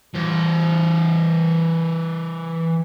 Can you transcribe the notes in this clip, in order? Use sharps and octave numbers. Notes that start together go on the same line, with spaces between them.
E3 C5